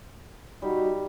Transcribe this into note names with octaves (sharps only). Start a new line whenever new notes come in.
G3 D#4 F#4